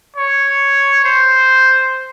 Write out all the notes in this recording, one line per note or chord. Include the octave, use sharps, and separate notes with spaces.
C#5
C5